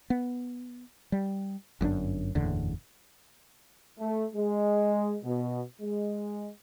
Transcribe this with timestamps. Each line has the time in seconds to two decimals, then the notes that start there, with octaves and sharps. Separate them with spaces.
0.10 B3
1.12 G3
1.81 G1 F#2 A2 D4
2.35 F#1 E2 A2 D3
4.00 A3
4.35 G#3
5.24 B2
5.82 G#3